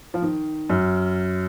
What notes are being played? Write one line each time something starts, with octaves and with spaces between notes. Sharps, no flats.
F3
D#3
F#2